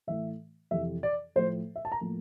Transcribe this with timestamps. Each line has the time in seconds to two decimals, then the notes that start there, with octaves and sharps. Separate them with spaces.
0.07 A2 E3 A3 E5
0.71 F2 C3 E3 E5
1.03 D5
1.36 A2 F3 A3 C5
1.76 E5
1.85 A5
1.92 A#5
2.01 A2 F3 A#3